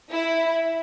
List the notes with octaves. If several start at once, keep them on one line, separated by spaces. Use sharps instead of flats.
E4